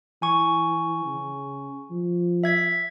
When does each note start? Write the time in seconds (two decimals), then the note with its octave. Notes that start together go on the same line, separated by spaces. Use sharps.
0.22 E3 G#5 C#6
1.06 C#3
1.90 F3
2.44 E5 G#6 B6